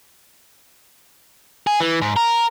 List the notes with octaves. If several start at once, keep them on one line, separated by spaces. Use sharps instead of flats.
G#4
E3
G#2
A#4